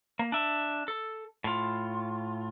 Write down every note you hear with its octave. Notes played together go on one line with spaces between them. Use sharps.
A#3
D4 E5
A4
A2 F4